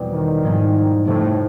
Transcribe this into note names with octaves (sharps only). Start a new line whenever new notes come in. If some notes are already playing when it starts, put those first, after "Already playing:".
Already playing: F1 E2 B2 G3 C4
D#3
G#2 F3 G#3 C4 D#4
F2 A2 C3 F3